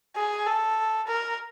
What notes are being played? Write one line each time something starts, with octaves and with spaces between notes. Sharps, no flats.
G#4
A4
A#4